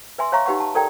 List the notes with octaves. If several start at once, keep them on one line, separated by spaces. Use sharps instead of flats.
B4 E5 G#5 C6
C#5 E5 F5 A#5 C#6
D#4 G4 B4 F#5 C#6
A5
A4 A#4 D5 G5 A#5